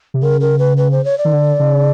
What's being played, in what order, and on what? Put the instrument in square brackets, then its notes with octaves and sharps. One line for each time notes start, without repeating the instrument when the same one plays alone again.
[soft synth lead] C3
[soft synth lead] C#3 [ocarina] A#4
[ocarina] A#4
B4
B4
C5
C#5
D5
[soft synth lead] D#3
D3
C#3